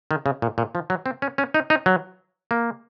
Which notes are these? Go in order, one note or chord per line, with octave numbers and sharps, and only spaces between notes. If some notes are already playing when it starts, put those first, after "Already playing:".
D#3
C#3
A#2
A#2
F3
F#3
C4
C#4
C#4
D#4
D#4
F#3
A#3